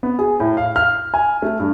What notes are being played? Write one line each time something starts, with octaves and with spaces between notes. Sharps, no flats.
B3
G#4
A2
F5
F6
G#5
A3
G2